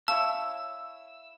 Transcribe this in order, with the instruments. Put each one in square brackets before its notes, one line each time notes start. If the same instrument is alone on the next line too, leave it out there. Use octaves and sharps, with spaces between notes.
[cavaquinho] E4 C#5 F5 [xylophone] A5 [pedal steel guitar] E6